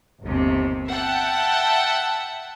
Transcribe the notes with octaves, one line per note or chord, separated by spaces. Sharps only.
G1 D#2 C3
E5 F#5 G5 A5